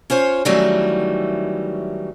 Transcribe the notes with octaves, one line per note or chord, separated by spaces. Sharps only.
C#4 F4 C5 C#5
D#3 E3 F#3 G3 A3 C#4